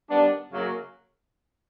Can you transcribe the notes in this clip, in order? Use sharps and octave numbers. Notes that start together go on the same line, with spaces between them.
D#3 G3 B3 D4
F#2 C#3 F#3 A#3 C#4